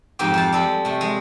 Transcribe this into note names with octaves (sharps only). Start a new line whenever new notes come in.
F2 G#2 C4 G4
F2 C5 A5
G3 G#3 A4
C3 A3
G#3